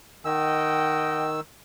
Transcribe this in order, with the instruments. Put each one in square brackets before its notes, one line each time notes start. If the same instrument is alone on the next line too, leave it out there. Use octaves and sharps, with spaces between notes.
[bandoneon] D#3 E6 [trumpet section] D#5 F#5 G5